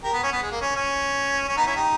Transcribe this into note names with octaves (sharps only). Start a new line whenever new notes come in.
G4 A#4
B3
C#4
B3
G#3
A#3
C#4
C#4
C#4
B3 D#4
C#4 E4
D#4 G4